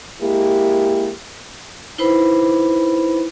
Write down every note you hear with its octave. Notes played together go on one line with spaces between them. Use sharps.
G#3 A#3 E4 G4
D#4 E4 B4 C5 B5